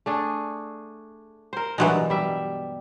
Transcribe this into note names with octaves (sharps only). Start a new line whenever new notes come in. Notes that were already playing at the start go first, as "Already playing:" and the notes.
A3 D4 G#4
A#4 C5
G2 B2 E3 F#3 G#3 A#4
G3 E5